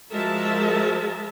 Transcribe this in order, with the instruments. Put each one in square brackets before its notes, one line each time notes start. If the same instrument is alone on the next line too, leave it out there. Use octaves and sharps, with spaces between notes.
[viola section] F3 G#3 F#4 A#4 E5 A5